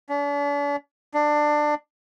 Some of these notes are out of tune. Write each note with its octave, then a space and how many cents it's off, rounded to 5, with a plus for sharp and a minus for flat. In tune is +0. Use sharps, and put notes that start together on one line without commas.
D4 -45
D4 +20